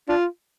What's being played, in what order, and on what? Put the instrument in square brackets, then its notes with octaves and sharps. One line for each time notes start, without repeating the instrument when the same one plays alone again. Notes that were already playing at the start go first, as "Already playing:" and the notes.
[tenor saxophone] D4 [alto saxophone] F4